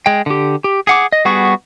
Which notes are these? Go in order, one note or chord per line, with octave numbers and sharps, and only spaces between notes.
G#3 G5
D3 G4
G4
G#4 F#5 D6
D#5
G3 B3 F#4 G#4 C#6